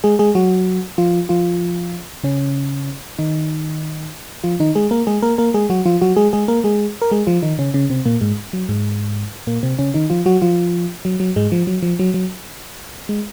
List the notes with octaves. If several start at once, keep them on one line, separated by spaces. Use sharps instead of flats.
G#3 G#4
G#3 G#4
F#3 F#4
F3 F4
F3 F4
C#3 C#4
D#3 D#4
F3 F4
D#3 D#4
G#3 G#4
A#3 A#4
G#3 G#4
A#3 A#4
A#3 A#4
G#3 G#4
F#3 F#4
F3 F4
F#3 F#4
G#3 G#4
G#3 G#4
A#3 A#4
G#3 G#4
A#4
G#3 G#4
F3 F4
D#3 D#4
C#3 C#4
C#3 C#4
C3 C4
A#2 A#3
G#2 G#3
F#3
G#2 G#3
A#2 A#3
C3 C4
C#3 C#4
D#3 D#4
F3 F4
F#3 F#4
F3 F4
F#3
F#3
G#2 G#3
F3
F#3
F3
F#3
F#3
G#3